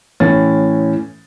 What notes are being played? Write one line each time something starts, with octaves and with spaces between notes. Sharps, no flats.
A2 E3 C#4 A6